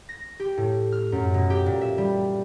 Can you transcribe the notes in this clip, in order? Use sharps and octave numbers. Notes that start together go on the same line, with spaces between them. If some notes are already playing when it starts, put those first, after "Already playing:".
A#6
G4
A2
F6
F#2
B2
G4
A#2
E5
G3